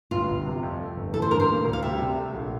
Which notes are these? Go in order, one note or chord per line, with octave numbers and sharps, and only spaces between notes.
G1 F4
G1
C3
F2
A3
G1
E3 A4
C5
G2 A#4
C5
A#3
D2
F5
G3 E5
C3
A3
A#1